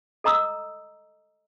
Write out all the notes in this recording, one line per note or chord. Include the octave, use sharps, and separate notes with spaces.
A4 D#5 A#5 D#6 E6